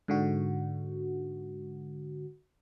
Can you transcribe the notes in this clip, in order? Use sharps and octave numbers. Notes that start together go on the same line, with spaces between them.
G#2 D3 F#4